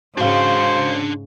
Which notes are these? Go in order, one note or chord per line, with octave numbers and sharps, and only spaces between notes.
G#2 C#3 D4 F#4 C5 F5 C6